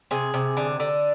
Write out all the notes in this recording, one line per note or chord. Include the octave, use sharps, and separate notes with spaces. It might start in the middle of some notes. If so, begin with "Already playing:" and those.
C3 G#4
C3
D3
D3